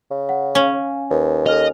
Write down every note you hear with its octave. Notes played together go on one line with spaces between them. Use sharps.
C#3
F#5
C#4 F5
D#2 B4
A4 D#5 F6 F7